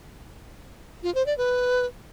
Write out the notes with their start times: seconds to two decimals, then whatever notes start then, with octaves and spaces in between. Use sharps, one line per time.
1.03 F4
1.15 C5
1.26 D5
1.38 B4